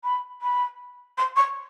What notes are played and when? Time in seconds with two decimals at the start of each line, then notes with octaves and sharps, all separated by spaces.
0.03 B5
0.41 B5
1.17 C6
1.36 C#6